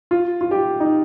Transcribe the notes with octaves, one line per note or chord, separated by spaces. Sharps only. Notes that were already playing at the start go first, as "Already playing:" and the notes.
F4
F4
G4
D#4